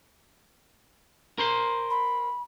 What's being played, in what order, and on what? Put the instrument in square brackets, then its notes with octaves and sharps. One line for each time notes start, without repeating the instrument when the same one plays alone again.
[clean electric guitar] A#4 C5 C6
[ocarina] B5